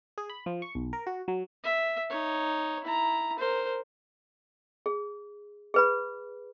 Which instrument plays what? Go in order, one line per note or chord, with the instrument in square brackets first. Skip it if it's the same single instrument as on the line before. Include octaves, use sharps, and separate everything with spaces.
[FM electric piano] G#4
B5
F3
C#6
B1
A#4
F#4
F#3
[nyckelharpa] E5
D#4 C#5
E4 A#5
A#4 C5
[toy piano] G#4
G#4 B4 B5